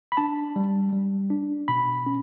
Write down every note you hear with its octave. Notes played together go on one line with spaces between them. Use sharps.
B5
D4 A5
G3
G3
D4
B2 B5
C#4